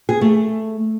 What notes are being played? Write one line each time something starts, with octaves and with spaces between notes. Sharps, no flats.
G#4
A3